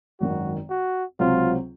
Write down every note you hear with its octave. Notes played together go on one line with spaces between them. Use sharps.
G#1 F#2 D#3 F#4
F#4
C#2 C3 F#3 C4 F4